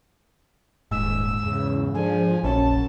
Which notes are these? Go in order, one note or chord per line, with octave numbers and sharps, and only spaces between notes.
D#1 G#2 E6
E2 C#3
F3 D4 G#4 A4 G#5
F1 A#1 F#2 C#4 A5